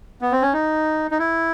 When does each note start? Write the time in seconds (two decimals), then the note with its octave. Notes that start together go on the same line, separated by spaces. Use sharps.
0.21 B3
0.32 C4
0.42 C#4
0.53 D#4
1.11 D#4
1.19 E4